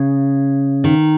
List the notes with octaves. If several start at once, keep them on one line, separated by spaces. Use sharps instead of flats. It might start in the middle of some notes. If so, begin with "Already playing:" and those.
Already playing: C#3
D#3